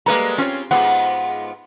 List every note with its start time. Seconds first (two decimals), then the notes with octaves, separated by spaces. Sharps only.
0.06 G3 G#3 A#3 A4 B4 A#5
0.38 C4 C#4 F4 C#5
0.71 G#2 B3 F4 G#4 F#5